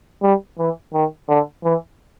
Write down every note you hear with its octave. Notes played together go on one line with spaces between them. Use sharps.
G3
E3
D#3
D3
E3